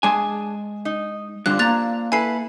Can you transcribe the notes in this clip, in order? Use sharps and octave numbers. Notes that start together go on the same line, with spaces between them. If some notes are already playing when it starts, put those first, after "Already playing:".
G#3 D4 G#4 G#5 A5
D#4
G2 D3 C4 D4 F4 F#6
A#3 A#5 F#6 A6 F7
E4 A4 B4 G#5 C7